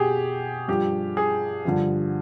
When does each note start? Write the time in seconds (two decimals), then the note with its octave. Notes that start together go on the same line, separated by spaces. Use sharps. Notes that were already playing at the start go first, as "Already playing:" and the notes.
Already playing: B2 G4 G#4
0.68 G2 F3 G4
1.17 G#4
1.65 G2 D3 F3